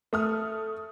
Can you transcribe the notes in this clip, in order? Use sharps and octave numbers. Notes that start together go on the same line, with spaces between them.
A3 D#6 F6